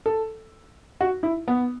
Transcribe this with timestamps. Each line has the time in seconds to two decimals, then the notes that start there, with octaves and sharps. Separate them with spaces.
0.06 A4
1.01 F#4
1.23 E4
1.48 B3